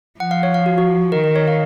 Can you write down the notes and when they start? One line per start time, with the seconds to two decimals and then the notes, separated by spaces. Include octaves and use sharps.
0.19 F3 F#5
0.31 F5
0.43 C#5
0.54 F5
0.66 F#4
0.78 F#4
1.12 D#3 A#4
1.24 A#4
1.36 C#5
1.48 F5